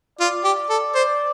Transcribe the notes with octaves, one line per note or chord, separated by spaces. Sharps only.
F4 D5
G4
A4
C5